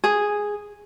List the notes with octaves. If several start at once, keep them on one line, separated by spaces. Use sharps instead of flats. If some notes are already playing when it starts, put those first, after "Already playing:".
G#4